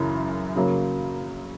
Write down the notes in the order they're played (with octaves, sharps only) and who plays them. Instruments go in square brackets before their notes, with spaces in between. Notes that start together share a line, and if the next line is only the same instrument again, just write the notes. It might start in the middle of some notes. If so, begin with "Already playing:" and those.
Already playing: [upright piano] F#2 C#3 E3
C#3 F#3 A#3